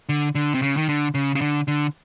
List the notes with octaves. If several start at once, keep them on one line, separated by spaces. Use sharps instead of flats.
D3
D3
C3
C#3
D#3
D3
C#3
C#3
D3
D3